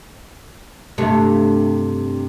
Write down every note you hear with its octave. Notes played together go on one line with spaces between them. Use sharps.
G2 C3 A3